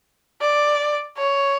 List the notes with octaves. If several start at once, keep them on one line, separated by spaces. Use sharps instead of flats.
D5
C#5